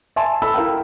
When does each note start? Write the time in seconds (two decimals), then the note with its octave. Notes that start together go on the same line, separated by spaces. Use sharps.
0.16 E5 G#5 A5 C6
0.42 A4 B5 E6
0.54 E4 A#4 F5 G5